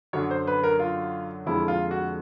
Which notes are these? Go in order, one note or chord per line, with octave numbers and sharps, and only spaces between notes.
F#2 D3 F#3 C#5
C5
B4
A#4
F4
F2 D3 F3 G#3 E4
F4
F#4